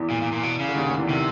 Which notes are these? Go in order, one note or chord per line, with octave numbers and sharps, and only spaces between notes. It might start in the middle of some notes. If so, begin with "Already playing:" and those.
Already playing: E2 E3
A#2
A#2
A#2
B2
C#3
D3
D#2 D#3
D2 D3
E2 E3
C3 D#3